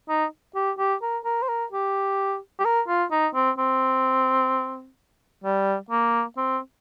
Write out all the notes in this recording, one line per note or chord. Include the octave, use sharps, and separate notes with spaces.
D#4
G4
G4
A#4
A#4
C5
A#4
G4
G4
A#4
F4
D#4
C4
C4
G3
A#3
C4